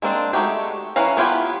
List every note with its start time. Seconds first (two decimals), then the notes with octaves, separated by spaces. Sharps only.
0.02 G#3 A#3 C4 D4
0.33 G#3 A3 D#4 F#4 G4
0.96 E3 C#4 B4 F5 A#5
1.17 B3 E4 F4 G4 G#5